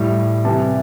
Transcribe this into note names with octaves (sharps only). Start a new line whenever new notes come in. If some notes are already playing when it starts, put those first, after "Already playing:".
Already playing: A2 G3
C3 E3 G3 A5